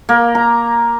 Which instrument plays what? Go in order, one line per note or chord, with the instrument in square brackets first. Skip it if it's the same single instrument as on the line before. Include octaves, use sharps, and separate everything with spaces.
[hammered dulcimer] A#3
A#5